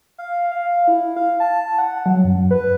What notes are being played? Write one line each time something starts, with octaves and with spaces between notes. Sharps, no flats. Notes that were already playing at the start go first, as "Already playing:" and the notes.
F5
F5
E4
F5
A5
F#5
F#3
F#2
B4